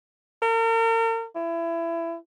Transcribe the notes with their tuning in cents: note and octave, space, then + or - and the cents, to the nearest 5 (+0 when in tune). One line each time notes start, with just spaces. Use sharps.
A#4 -40
E4 +25